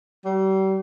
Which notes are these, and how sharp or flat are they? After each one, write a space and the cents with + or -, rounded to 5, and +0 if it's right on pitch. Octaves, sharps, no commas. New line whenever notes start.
G3 -40